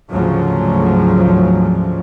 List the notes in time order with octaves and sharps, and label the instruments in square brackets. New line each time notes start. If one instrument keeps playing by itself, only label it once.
[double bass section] D2 G#2 C#3 F3 F#3